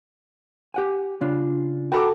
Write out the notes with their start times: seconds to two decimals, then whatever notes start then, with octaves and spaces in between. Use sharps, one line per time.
0.74 G4 F#5 G#5
1.21 C#3 D4 F4
1.92 F#4 A4 G5 A#5 B5 D6